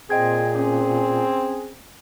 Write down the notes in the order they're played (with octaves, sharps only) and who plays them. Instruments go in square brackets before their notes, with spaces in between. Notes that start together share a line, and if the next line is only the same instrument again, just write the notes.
[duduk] A#2 [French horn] C4 [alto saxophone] G#4 [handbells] D#5 G5 G#6
[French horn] C4 [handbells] C#4